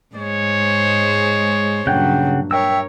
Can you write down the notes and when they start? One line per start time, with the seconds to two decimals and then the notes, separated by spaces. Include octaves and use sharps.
0.15 G#2 G#3 C5 C#5
1.87 G2 A#2 C#3 F#3 F#5 G5
2.51 A#4 C#5 E5 G5 E6